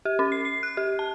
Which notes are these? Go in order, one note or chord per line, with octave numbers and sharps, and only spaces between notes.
G4
C#4
C7
C7
F#6
G4
A5